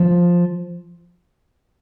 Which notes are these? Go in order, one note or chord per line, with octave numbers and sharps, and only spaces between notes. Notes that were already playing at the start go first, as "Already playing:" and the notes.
Already playing: F3